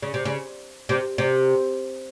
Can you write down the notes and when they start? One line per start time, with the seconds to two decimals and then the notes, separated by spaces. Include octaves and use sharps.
0.02 C#3
0.14 C3
0.25 C#3
0.89 C3
1.18 C3